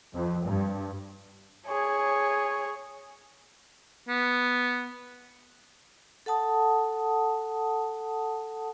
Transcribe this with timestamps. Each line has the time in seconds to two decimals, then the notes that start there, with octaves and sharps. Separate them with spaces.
0.14 F2
0.46 G2
1.67 G#4 C#5
4.09 B3
6.26 A4 F#5 A5 D#6